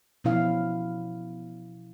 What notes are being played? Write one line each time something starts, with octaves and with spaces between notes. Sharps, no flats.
B2 F3 C#4 E4 F5